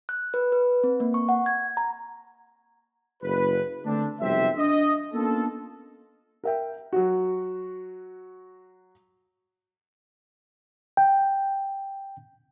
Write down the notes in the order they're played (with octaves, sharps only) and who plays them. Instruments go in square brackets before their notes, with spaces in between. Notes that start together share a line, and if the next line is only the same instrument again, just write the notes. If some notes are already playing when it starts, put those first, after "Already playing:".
[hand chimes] F#6
B4
B4
C4
A#3
C#6
F#5
G#6
A#5
[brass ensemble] F#1 B4
D3 A3 C4 D4
B1 F2 C3 G3 C4 E5
D4 D#5
A#3 B3 C#4 D4 F4 A4
[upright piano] A#4 E5 G5
F#3 F#4
[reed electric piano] G5